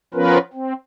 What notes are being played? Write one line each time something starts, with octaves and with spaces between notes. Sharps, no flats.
F3 B3 C#4 F4 A#4 B4
C4